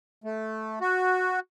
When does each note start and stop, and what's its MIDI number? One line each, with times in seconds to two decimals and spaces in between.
0.24 0.79 57
0.81 1.40 66